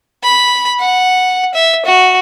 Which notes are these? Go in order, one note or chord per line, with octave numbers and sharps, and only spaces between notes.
B5
F#5
E5
F#4